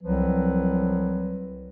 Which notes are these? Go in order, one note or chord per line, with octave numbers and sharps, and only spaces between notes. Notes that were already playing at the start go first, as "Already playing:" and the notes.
C2 F3 F#3 C4 B4